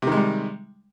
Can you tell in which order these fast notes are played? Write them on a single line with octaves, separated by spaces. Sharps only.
C3 D#3 G#3 G3